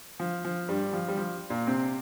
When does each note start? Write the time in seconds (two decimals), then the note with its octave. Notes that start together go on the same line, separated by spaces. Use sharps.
0.20 F3
0.45 F3
0.68 G2 G3
0.93 F3
1.08 G3
1.17 F3
1.50 A#2 A#3
1.67 C3 C4